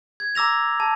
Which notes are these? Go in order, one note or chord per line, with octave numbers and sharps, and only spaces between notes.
G#6
A#5 D6 E6 A#6 F7
A5